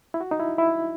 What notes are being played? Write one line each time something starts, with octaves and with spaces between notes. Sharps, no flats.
E4
F#4
D#4
E4
E4